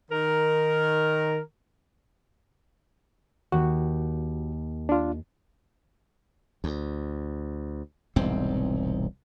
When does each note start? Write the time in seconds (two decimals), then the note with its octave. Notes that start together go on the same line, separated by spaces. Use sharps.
0.11 D#3 A#4
3.52 D#2 F#4
4.89 D4 F4
6.64 D2
8.16 E1 C2 G#2 C4